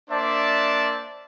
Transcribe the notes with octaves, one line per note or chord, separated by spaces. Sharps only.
A#3 D4 C5 D5 E5 A5